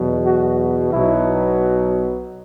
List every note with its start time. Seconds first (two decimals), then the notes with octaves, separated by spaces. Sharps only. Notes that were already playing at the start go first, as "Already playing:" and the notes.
Already playing: E2 B2 F#3
0.25 F#4
0.92 B1 B2 F#3 E4